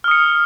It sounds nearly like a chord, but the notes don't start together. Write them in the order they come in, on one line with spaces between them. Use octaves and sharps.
F6 D#6 C#7